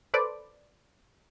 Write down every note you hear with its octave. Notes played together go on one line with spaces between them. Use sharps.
A4 B4 C5 D5